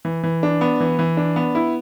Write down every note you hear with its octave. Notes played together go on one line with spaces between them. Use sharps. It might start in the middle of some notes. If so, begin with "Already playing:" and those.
E3
E3
D4
B3
E3
E3
D4
B3
E4